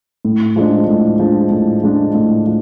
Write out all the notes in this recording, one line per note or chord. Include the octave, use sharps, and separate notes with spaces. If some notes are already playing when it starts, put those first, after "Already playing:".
A2
F3 G#3 D4
A2
F3 G#3 D4
A2
F3 G#3 D4
A2
F3